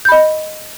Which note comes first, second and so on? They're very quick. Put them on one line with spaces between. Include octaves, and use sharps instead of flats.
G6 B5 D#5